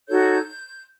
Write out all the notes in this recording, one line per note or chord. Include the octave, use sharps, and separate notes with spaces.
D#4 F#4 A4 C#5 G6